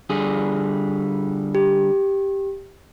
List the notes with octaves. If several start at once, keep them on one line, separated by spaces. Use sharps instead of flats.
D3 G3 G#4
G4